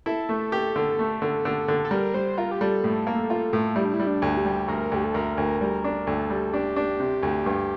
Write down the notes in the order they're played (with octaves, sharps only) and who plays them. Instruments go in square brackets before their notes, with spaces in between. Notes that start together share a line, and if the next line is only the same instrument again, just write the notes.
[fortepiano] E4 [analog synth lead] A4
[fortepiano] A3
G4
D3
A3
D3
D3
D3
[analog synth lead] A4
[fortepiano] G3 [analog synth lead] A#4
[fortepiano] G3 [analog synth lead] C5
[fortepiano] F4 [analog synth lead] A#4
[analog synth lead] G4
[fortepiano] G3 [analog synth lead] A4
[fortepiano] A2
A#3
F4
A2
[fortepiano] G3 [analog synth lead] E4
[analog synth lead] D4
E4
[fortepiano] G3
[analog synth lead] D4
[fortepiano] D2
[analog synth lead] G4
[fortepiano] G3
[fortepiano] D2 [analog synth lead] A#4
[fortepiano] D2 [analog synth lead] G4
[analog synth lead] A4
[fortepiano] D2 [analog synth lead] A#4
[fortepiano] D2
[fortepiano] G3 [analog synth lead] A#4
[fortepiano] D4
[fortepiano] D2 [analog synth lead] A4
[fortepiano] G3
[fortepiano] D4 [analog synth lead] G4
[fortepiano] D4
C3
D2
G2